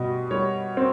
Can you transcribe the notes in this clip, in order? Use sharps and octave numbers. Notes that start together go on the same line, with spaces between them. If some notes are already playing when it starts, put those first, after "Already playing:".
Already playing: B2 G3 D#5
G3 C#5
C4